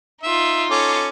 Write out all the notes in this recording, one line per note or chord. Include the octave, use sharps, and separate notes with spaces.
D#4 F4 E5
C#4 A4 D6